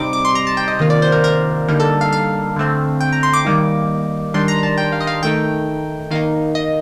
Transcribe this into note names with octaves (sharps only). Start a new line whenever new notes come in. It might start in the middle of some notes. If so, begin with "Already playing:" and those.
Already playing: C3 G3 C4 D#4 D6
D6
C6
A#5
A5
G5
D#5
C3 D#3 A#3 F4 D#5
D5
C5
A#4
A#4
D3 G3 A#3 D#4 A#4
A4
F5
F5
D3 A3 C4
G5
A#5
C6
D6
D#3 G3 A#3 D#4
D#3 G3 D4 C6
A#5
A5
G5
F5
D#5
F5
D#3 A3 D#4 G5
D#3 A#3 D#4 F5
D#5